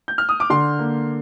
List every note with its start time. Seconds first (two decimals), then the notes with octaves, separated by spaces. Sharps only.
0.08 G6
0.18 F6
0.29 D#6
0.40 D6
0.50 D3 C6
0.79 A#3